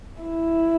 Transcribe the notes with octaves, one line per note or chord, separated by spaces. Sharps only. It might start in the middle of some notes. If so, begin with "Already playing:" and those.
E4